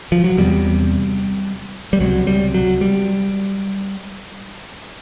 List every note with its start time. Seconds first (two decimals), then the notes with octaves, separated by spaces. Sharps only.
0.12 F3
0.24 F#3
0.38 E2 C3 G3
1.93 G3
2.00 C#2 C3 F#3
2.27 G3
2.54 F#3
2.81 G3